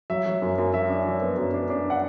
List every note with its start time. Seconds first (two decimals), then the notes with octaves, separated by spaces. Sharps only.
0.10 F#3 E5
0.26 F#3
0.42 F#2
0.58 F#2
0.74 F#3 E5
0.90 D4
1.06 F#3
1.22 B3
1.37 F#2
1.54 D4
1.70 D4
1.90 F#5